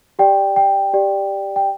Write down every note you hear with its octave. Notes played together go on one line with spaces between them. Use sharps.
G4 D5 G5
G5
G4 D5
G5